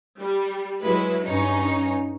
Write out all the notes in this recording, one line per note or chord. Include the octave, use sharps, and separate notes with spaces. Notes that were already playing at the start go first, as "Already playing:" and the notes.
G3
F#3 G#3 E4 B4
G2 C#4 D#4